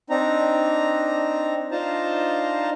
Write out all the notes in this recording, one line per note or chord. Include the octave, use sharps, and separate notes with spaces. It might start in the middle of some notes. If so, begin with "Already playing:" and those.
C4 D4 D#4 A#5
D4 D#4 F4 C5 A5 A#5